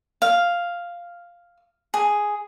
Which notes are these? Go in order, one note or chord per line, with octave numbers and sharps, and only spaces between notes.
F5
G#4